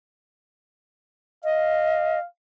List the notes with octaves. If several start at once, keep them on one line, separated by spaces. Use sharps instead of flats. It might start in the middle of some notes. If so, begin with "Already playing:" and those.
D#5 F5